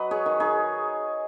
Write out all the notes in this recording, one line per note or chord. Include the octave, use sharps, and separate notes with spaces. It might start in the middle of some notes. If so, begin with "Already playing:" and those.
Already playing: F#3 B4 D#5
G#4 C#5
D#3
D#4 G#4